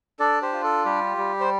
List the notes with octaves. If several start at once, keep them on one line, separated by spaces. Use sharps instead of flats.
D4 A4 D5
G4 C5
F4
A4
G3 G4
G3
C5